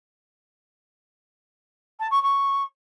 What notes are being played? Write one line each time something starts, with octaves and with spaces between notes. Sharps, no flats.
A5
C#6
C#6